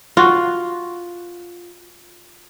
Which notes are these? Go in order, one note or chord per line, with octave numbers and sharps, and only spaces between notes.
F4 F#4